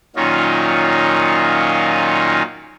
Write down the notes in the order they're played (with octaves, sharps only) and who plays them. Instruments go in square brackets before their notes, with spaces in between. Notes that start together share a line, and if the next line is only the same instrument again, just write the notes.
[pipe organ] A#2 D#3 F#3 C#4 D#4 F4